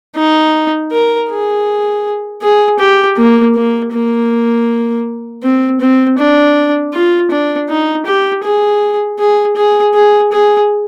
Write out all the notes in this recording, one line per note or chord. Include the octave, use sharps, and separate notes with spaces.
D#4
A#4
G#4
G#4
G4
A#3
A#3
A#3
C4
C4
D4
F4
D4
D#4
G4
G#4
G#4
G#4
G#4
G#4